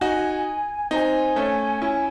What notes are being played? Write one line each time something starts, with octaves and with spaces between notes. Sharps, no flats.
D#4 F#4 G#5
C4 D#4 A#5
G#5
A3 C#4
C#4 E4